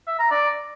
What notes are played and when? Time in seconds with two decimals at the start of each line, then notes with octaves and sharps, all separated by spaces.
0.07 E5
0.19 A#5
0.31 D5